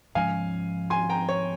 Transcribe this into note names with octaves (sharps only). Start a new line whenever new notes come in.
G#2 F3 G#3 C#4 F5 G#5
G#5 C6
G5 A#5
C#5